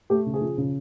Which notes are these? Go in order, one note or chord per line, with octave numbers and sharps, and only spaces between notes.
A3 G4
C#3
G#4
F3
C#3